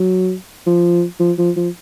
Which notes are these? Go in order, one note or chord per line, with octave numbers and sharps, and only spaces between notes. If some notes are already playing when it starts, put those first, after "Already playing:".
Already playing: F#3
F3
F3
F3
F3